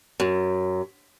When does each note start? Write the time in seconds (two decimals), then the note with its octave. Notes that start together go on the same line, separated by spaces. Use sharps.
0.20 F#2